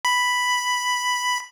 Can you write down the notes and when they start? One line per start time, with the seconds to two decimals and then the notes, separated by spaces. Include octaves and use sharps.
0.05 B5